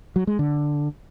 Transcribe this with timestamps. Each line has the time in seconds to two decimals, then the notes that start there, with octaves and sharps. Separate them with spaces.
0.16 F#3
0.27 G#3
0.39 D3